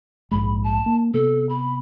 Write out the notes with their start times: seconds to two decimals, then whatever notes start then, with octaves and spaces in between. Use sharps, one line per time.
0.31 A#1 G#2 G#3 B5
0.64 A5
0.86 A#3
1.14 C3 B3 A4
1.49 B5